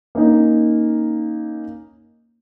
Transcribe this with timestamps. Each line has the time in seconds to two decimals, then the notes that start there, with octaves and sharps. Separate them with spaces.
0.15 A#3 C#4 D#4